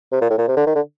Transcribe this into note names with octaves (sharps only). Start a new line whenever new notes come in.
C3
A#2
A2
A#2
C3
D3
D#3
D3